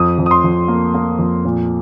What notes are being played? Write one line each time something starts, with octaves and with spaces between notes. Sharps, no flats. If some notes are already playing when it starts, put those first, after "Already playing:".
Already playing: F2 D#6
F2
D#6
C6
F2
A#3
A#3
F2
A#2